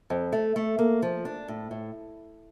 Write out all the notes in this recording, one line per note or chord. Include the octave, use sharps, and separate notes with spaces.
F2
A3
A3
A#3
F3
D4
A2
A2